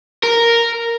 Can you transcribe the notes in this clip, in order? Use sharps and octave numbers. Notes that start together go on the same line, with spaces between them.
A#4